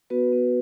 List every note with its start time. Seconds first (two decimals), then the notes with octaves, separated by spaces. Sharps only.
0.10 B3 F#4 B4
0.32 B3